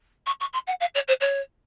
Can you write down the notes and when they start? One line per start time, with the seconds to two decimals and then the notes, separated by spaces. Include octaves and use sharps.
0.26 C#6
0.40 C#6
0.53 C6
0.67 F#5
0.81 F5
0.95 C#5
1.08 C5
1.21 C#5